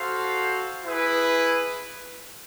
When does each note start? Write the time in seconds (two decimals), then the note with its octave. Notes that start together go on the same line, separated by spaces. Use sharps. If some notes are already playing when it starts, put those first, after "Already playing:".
Already playing: F#4 A4 C5 F5
0.84 E4 G#4 B4